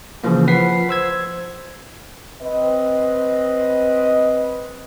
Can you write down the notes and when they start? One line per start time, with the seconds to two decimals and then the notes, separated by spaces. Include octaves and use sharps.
0.24 C#3 E3 F3 A#3
0.48 F3 B4 F#5 B6 C7
0.89 C5 E6 G#6
2.42 C4 B4 D#5